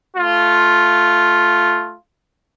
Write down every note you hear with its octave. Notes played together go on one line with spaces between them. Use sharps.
A3 F4